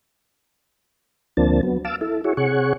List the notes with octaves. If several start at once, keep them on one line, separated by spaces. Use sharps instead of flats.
D2 F3 A#3 C4 D4 A5
F#3 B3
F5 A5 D6 E6
E4 A4
E4 F#4 G#4 C#5
C3 G#4 C#5 F#5 C#6